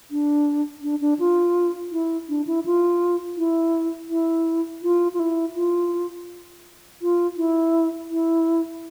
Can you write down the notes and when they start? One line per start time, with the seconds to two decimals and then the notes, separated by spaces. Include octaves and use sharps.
0.11 D4
0.83 D4
1.01 D4
1.19 F4
1.92 E4
2.29 D4
2.47 E4
2.66 F4
3.38 E4
4.10 E4
4.83 F4
5.14 F4
5.20 E4
5.55 F4
7.02 F4
7.37 E4
8.11 E4